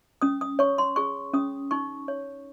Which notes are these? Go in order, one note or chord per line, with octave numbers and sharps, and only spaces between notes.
C#4 D#6
D#6
C#5 C#6
C6
G#4 C#6
C#4 D#6
D#4 C#6
C#5